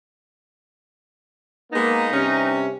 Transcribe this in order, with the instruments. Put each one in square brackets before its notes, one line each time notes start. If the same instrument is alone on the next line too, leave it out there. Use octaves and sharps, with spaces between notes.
[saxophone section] G#3 B3 [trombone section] A#3 [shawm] D#4
[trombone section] G2 C3 [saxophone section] C#4